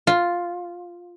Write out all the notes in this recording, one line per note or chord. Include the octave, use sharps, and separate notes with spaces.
F4